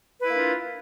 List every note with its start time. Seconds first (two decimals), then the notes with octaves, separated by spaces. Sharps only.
0.20 B4
0.24 E4
0.29 A#3
0.33 D4
0.37 F4